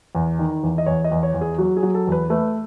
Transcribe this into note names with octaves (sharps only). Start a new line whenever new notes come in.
E2
D#3
E2
D#5
E2 C#5
D#5
E2
C#5
E2
G#4
F#3 F#4
G#4
F#3
A4
E2 B4
A3 B4